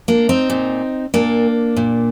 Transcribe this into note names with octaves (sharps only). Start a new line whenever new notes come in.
A#3 D4
C4 D#4
A#2
A#2 A#3 D4
A#2